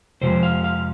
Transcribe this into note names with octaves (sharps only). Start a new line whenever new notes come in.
F2 C3 F3 G#3 C5
F5
F5